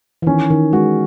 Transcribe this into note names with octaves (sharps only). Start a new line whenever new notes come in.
E3
D#3 C#4
D#3
G#3 F#4